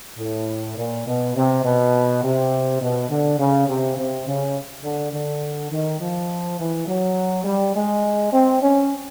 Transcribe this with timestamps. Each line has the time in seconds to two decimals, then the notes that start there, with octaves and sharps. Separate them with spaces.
0.18 A2
0.77 A#2
1.05 B2
1.35 C3
1.63 B2
2.22 C3
2.80 B2
3.09 D3
3.38 C#3
3.67 C3
3.97 C3
4.26 C#3
4.83 D3
5.12 D3
5.70 D#3
6.00 F3
6.58 E3
6.87 F#3
7.44 G3
7.74 G#3
8.32 C4
8.61 C#4